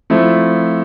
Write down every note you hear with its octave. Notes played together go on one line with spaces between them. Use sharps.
F3 A3 C4 E4